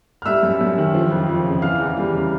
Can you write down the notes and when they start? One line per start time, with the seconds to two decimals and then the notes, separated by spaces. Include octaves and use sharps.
0.22 F6
0.26 G3 E5 E6
0.43 F#2
0.61 F#2
0.78 D#3
0.94 F3
1.11 F2
1.29 F2
1.45 C#3
1.62 E3 F5 F6
1.80 E2
1.97 G3
2.14 C#3